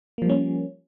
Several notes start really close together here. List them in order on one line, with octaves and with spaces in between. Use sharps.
A#3 F3 G3 C#4